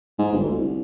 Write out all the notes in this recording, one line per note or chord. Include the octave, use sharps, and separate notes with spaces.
G#2
G1
D2
C2